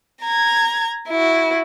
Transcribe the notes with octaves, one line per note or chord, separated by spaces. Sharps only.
A#5 G#6
E4 F#4